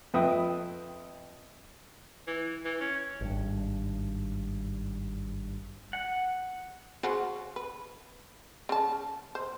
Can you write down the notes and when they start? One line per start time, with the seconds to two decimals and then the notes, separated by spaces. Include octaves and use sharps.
0.14 F2 B4 E5 G5 D#6
2.27 E3
2.65 E3
2.80 C#4
3.21 G#1 G2
5.93 F#5
7.03 C#3 F#4 C5
7.56 B4
8.69 C#3 A5
9.35 C5